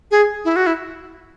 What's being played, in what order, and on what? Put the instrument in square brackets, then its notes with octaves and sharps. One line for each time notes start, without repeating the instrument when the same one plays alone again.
[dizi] G#4
E4
F#4
E4